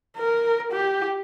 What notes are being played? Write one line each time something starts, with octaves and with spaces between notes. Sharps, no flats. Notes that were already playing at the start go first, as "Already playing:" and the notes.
A#4
G4